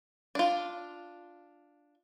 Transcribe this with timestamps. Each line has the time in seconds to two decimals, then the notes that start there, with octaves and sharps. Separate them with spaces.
0.35 D4 F4